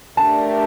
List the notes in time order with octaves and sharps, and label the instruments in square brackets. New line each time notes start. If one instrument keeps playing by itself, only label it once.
[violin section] A3 D4 G4 A#4 [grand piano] A5